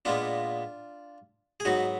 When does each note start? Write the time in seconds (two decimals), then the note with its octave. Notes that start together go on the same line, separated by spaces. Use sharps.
0.05 A#2 G#3 B3 D4 F4
1.60 G#4
1.65 G#2 F#3 B3 D#4 F#4